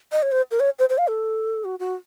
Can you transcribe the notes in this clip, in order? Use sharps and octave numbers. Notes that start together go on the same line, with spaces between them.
D#5
C#5
C5
A#4
C#5
C5
C5
F5
A4
F#4
F#4